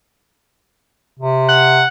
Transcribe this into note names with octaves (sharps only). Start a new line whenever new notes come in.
C3
F#5